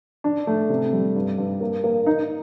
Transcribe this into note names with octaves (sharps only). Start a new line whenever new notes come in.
D4
A3
C3
G3
G2
G2
A#3
A#3
D#4